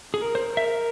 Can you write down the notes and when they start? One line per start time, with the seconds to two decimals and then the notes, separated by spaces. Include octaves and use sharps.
0.14 G#4
0.21 A#4
0.35 C5
0.50 A#4
0.57 E5